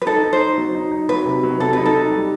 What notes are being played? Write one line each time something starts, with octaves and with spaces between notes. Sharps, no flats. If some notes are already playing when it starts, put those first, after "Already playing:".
B4
D#4 A4
D#4
C5
D#4
F#3
D#4
D#4
F#3 B4
C3
F#3
C3 A4
D#4 B4
A4
D#4
G3